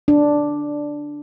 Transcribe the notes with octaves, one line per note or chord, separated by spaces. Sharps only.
D4